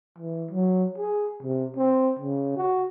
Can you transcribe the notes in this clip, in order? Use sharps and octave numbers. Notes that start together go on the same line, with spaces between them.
E3
F#3
G#4
C3
C4
C#3
F#4